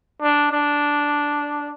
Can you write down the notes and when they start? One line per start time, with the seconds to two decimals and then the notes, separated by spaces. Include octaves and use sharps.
0.22 D4
0.51 D4